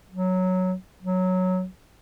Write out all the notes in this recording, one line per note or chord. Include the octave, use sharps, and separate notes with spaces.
F#3
F#3